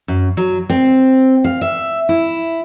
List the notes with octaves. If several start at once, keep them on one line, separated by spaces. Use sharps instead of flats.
F#2
F#3
C4
F5
E5
E4